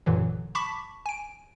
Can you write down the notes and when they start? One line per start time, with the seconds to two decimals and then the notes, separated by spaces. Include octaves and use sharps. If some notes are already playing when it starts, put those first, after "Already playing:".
0.06 A1 F#2 A#2 D3 E3 F#3
0.55 A5 B5 C#6 D6 B6
1.06 G#5 D7